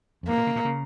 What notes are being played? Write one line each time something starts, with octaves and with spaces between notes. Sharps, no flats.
F2
G2 A#3
A#2
C#3
A#2
C#3